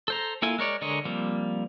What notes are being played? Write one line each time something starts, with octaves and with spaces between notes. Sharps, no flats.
A4 C5 A#5
A#3 E4 F4 A4 G#5
G#3 A#4 C#5 D5
D3 G#3 A#4 C#5 D#5
F3 G3 A#3 C4